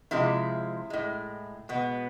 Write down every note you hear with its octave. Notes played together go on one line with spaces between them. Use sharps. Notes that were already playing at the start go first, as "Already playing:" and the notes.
C3 F3 G#3 E4
A2 G#3
B2 G#3 B3